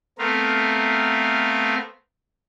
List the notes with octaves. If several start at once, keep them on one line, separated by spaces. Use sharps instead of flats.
A3 B3 C4 A#4 F5